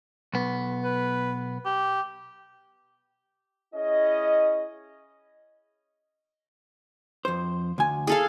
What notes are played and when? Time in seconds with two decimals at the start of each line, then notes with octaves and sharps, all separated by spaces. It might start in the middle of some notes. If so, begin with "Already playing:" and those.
0.34 B1 B3
0.84 B4
1.66 G4
3.75 C#4 E4 G#4 D#5
7.25 F2 C5
7.78 D2 G#5
8.07 G#4 A4 F5